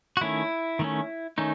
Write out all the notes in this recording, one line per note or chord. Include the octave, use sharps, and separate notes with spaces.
F#4
D#3 A3 C#4 E4
D#3 A3 C#4
D#3 A3 C#4 D#4